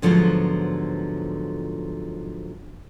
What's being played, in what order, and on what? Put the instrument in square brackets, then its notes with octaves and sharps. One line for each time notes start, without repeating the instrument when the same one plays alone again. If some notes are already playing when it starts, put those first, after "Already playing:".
[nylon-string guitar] G#2 D3 F3 F#3 B3 F4